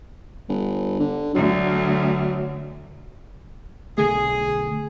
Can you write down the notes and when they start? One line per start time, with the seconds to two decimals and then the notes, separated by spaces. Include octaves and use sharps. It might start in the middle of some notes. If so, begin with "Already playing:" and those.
0.49 G1
1.00 D3
1.35 D2 F#3
3.98 B1 D3 A3 G#4